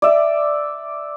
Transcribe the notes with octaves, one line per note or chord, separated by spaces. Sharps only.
D5 E5